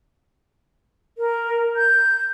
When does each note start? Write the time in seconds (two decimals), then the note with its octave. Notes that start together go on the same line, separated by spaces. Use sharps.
1.18 A#4
1.76 G6